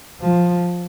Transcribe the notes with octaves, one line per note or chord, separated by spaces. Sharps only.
F3